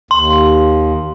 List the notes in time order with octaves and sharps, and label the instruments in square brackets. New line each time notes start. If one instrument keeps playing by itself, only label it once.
[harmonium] D#2 [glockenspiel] C6